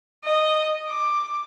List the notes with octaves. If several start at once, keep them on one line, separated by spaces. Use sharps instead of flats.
D#5
D6